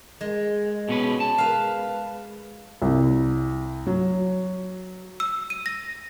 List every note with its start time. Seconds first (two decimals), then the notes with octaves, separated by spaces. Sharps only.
0.21 G#3
0.89 B2 C#4 B4
1.20 A5
1.38 B4 F5
2.82 C2
3.87 F#3
5.20 E6
5.50 D#7
5.66 A#6